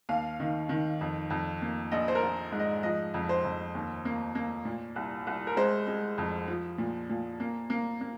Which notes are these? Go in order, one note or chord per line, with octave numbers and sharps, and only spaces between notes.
D#2 F5
D#3
D#3
F2
F2
A#3
A#1 D#5
C5
A#4
A#1
G#2
D#5
F3 D#5
F2
C5
F2
D#2
A#3
A#3
A#2
C2
C2
A#4
G#3 C5
G#3
F2
F3
A#2
A#2
A#3
A#3
A#3